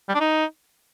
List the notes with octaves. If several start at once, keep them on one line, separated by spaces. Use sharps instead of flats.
G3
D4
D#4